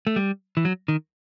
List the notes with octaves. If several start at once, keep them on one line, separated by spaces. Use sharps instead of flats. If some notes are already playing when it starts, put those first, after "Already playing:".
A3
G3
E3
F#3
D#3